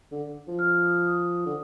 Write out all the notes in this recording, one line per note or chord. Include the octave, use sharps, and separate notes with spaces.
D3
F3
F6
D#6
D#6
D3